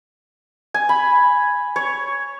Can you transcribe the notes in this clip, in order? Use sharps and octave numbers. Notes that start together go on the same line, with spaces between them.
G#5
B5
C#5